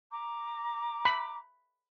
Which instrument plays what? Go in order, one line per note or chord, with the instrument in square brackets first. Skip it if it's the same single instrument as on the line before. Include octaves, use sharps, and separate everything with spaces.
[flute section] A#5 D6
[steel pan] B5